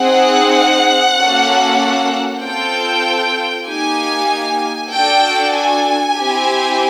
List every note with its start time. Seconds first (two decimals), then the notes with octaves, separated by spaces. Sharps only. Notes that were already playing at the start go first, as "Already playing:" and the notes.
Already playing: C4 D#4 G#4 F#5
1.16 A#3 C#4 F#4 A4
2.40 C4 F4 A4 G5
3.65 A#3 D#4 G4 G#5
4.90 D4 F#4 A4 G5
5.53 G#5
6.15 C4 E4 G4